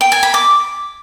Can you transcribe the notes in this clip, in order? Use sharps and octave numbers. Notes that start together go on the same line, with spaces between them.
G5
G#5
B5
D6